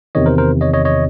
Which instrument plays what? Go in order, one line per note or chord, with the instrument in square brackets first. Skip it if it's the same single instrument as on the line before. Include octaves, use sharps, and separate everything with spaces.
[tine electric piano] E2 C3 D#3 C#5 D#5
A#4 C5
A#4 C5
C#5 D#5
C#5 D#5
C#5 D#5